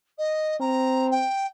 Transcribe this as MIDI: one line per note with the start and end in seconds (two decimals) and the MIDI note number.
0.18 0.56 75
0.60 1.25 60
0.60 1.07 82
1.11 1.46 79